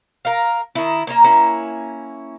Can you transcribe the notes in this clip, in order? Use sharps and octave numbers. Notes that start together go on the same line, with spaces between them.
A#4 F5
D#3 E4
A#3 C#4 A#5
A#3 C#4 E4